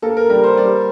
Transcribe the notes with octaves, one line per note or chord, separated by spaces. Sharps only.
A#3 A4
A#4
G3 A#4
C5
G3 D5